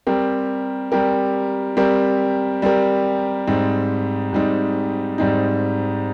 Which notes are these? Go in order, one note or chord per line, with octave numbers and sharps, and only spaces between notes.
G3 C4 G4 A#4
G3 C4 G4 A#4
G3 C4 G4 A#4
G3 C4 G4 A#4
G#2 G3 C4 D#4
G#2 G3 C4 D#4
G#2 G3 C4 D#4